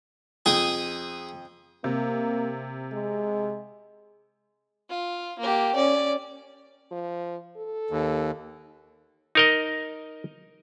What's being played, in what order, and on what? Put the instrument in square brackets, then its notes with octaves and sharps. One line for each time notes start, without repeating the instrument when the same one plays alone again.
[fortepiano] F2 [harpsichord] G#4 G5 D#6
[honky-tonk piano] C3 [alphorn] A#3
[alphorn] G#3
[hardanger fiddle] F4
A#3 G4
C#4 D5
[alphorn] F3
A4
[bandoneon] D#2
[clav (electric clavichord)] D#4 A#4 D#5